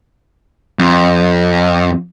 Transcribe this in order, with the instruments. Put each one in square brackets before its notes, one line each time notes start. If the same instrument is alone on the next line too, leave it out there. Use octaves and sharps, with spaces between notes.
[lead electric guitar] F2